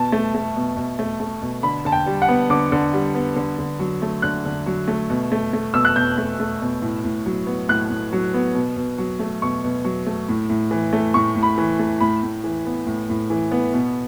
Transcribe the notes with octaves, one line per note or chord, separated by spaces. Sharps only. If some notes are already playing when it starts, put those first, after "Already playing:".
Already playing: B2 A5
A3
A3
B2
B2
A3
A3
B2
D3 B5
D3 A5
G5
G3
F#5
B3
D3 D6
D3
G3
B3
D3
D3
F#3
A3
D3 F#6
D3
F#3
A3
B2
A3
A3
B2 E6
F#6
B2 G6
A3
A3
B2
A2
A2
F#3
B3
A2 F#6
A2
F#3
B3
B2
B2
F#3
A3
B2 C#6
B2
F#3
A3
A2
A2
E3
A3
A2 C#6
A2
B5
E3
A3
A2 B5
A2
E3
B3
A2
A2
E3
B3
B2